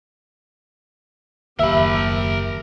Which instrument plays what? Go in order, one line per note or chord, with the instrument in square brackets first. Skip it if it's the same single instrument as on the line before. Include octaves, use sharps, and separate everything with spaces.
[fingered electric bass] F#1 D#2 [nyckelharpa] G4 [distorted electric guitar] A#4 B5 [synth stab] E5